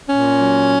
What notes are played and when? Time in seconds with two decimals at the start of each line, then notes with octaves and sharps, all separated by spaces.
0.09 A#2 C#4
0.40 F#3